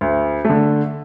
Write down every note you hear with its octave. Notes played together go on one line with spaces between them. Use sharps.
D2
A3
D3